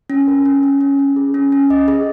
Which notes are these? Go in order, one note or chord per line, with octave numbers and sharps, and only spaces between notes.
C#4
A#4
C#4
C#4
C#4
C#4
G#4
C#4
C#4
D#5
G#4